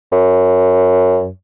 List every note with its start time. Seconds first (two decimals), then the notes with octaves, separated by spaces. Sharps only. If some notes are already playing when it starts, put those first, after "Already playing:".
0.12 F#2